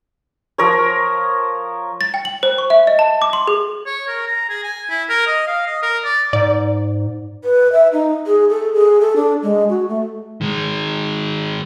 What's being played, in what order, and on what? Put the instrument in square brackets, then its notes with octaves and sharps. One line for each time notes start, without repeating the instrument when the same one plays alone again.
[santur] F3 A#4 C#5
[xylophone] A6
G5
F#7
C5
C#6
E5
D#5
A5
D6
C6
G#4
[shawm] C#5
A#4
A#5
G#4
G#5
E4
A#4
D#5
F5
D#5
A#4
D5
[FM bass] G#2 [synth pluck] D5
[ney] B4
E5
D#4
G#4
A4
G#4
A4
D4
G#3
F#4
A3
[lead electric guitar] D#3 G#3